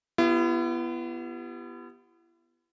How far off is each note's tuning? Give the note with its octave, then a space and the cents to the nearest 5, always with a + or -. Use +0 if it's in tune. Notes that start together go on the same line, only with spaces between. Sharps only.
B3 +0 E4 +40 G4 +0